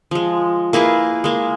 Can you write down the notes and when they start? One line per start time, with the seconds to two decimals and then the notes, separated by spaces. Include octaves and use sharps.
0.11 F3 G#3
0.73 A#3 E4 G#4 B4
1.24 G#3 A#3